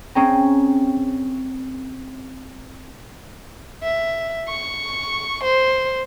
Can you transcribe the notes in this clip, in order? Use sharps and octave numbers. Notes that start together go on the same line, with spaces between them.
C4 C#4 G#4 G5 A#5
E5
C#6
C5